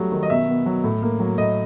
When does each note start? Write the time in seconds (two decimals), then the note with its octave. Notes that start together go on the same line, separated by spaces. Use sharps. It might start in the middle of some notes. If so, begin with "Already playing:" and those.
Already playing: F#3 G3 A3
0.12 D#3
0.23 D#5
0.30 B2 E5
0.48 B3
0.66 F#3
0.84 A2
1.02 A#3
1.20 F#3
1.38 A2 D#5